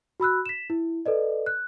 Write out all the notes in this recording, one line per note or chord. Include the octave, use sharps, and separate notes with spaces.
F#4 B5 E6 F#6
B6 E7
E4
A4 B4 D5 D#5
F#6